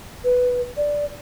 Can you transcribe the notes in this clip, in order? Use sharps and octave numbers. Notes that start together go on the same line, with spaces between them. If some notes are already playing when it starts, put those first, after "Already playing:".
B4
D5